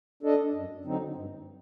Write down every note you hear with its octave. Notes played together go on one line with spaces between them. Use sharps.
D4 A4 D#5
F#2
D3 F#3 C4 D#4
G2